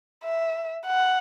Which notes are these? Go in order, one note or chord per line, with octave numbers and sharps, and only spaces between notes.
E5
F#5